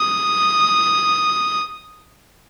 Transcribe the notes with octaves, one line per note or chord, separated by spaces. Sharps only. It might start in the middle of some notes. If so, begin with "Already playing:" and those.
Already playing: D#6